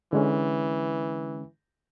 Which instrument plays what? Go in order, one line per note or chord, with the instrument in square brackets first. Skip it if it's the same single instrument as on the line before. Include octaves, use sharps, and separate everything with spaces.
[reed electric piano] D3 G#3 C#4 [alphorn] E3